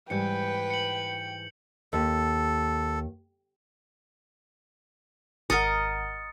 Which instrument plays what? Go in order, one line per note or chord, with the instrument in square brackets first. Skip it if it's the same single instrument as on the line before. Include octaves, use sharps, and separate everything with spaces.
[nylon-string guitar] G#2 E3 G3 [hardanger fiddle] B4 [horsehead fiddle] G5 [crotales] G6 C#7
[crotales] C#7 F#7
[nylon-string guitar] D#2 [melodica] A4
[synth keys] G#1 F#5 [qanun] A#4 D#5 [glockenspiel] D#6 A6 C#7